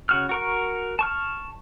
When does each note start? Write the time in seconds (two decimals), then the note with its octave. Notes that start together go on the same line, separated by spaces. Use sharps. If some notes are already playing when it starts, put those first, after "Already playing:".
0.09 C#3 F#4 F6
0.29 F#4 A#4 C#6
0.99 A5 C#6 F6